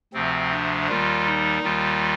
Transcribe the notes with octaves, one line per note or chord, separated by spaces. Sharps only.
D2 C3 F3 C4
D4
D#2 D#3 G3 F4
D#4
D#2 D#3 G3 F4